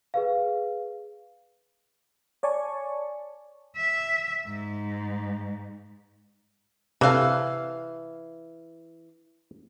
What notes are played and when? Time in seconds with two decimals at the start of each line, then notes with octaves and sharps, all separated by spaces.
0.14 G#4 B4 F5
2.43 C#5 D5 G#5 A5 C#6
3.76 E5
4.46 G#2
7.01 C3 E3 A4 F5